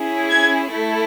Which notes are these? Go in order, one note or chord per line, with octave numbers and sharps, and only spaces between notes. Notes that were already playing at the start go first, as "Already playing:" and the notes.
Already playing: C#4 E4 G#4
G#6
A3 E4 A4